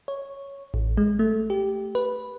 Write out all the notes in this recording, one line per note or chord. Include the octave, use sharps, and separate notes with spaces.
C#5
A1
G#3
A3
G4
B4